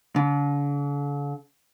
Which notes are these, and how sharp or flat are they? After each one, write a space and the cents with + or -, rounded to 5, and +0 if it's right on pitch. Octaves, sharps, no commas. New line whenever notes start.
D3 -45